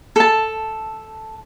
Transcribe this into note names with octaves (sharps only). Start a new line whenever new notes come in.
A4 A5